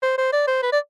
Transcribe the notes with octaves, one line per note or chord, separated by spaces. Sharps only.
C5
C5
D5
C5
B4
D5